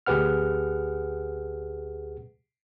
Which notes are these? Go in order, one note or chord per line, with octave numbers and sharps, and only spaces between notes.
D2 G4 G#4 B4 F#5 F6